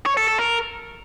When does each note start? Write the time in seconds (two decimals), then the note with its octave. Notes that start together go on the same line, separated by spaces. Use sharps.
0.06 C#5
0.17 A4
0.28 A4
0.39 A#4